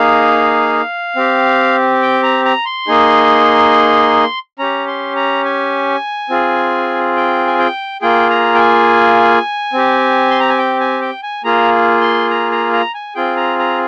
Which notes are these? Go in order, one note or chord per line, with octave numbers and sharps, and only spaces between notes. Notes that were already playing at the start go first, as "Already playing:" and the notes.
Already playing: A#3 D#4 G#4 F5
C4 G4
G5
A#5
A#5
C6
A#3 D#4 G#4
C#4 G4 A#5
C6
A#5
G#5
C4 F4 G#4
G5
G#5
G5
A#3 F4 G#4 G5
A#5
G5
G#5
C4 G4
C6
A#5
G#5
G5
G#5
G5
G#5
A#3 F4 G#4 A#5
C6
A#5
A#5
A#5
G#5
C4 F4 G#4 G5
A#5
A#5